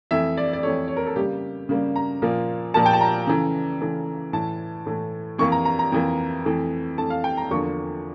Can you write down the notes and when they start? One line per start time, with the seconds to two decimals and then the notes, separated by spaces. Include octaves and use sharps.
0.11 F2 E3 A3 E5
0.37 D5
0.53 D5
0.63 F2 E3 A3 C#5
0.88 C#5
0.97 A#4
1.06 A4
1.16 C#3 G3 A#3 G4
1.69 C#3 G3 A#3
1.96 A#5
2.22 A#2 F3 A#3
2.74 A#2 F3 A#3 A5
2.86 G5
2.93 A5
3.01 A#5
3.27 C#3 E3 A3
3.81 C#3 E3 A3
4.33 A2 E3 A3 A5
4.86 A2 E3 A3
5.39 F2 E3 A#3 C#6
5.52 A#5
5.65 A#5
5.79 A#5
5.92 F2 E3 A#3
6.45 F2 E3 A3
6.98 F2 E3 A3 A5
7.10 F5
7.24 G5
7.37 A#5
7.51 E2 D3 F3 A#3 C#6